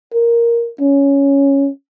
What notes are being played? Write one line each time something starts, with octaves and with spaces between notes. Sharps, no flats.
A#4
C#4